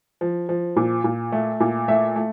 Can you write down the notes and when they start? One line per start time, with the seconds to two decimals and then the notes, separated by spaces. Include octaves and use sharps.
0.21 F3
0.49 F3
0.76 A#2
1.04 A#2
1.32 A3
1.60 A#2
1.88 A3 E5
2.16 A3